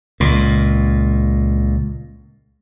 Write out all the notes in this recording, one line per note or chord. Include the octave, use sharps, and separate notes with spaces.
C#2 A#2